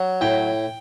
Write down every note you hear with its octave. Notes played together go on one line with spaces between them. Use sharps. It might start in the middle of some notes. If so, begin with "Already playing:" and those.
Already playing: F#3
A2 G5